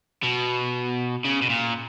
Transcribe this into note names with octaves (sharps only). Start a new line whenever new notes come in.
B2
C#3
B2
A#2